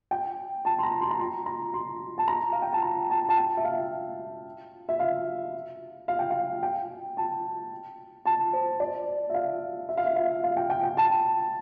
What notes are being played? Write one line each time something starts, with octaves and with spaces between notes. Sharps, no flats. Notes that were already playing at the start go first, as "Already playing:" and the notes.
G5
A5
C6
A#5
C6
A#5
C6
A#5
C6
A5
A#5
F5
G5
A5
A#5
A5
A5
G5
E5
F5
E5
F5
F5
G5
F5
G5
A5
A5
C5
D5
E5
F5
E5
F5
E5
F5
F5
G5
G5
G5
A5